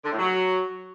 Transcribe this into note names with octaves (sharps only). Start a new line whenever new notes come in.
D3
A2
F#3